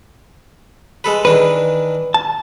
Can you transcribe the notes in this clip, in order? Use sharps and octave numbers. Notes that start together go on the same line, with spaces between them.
G#3 A4 B4
D#3 E3 D4 B4
A5